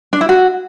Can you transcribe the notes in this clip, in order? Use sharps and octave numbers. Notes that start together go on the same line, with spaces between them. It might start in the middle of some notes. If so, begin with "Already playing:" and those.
D4
E4
F#4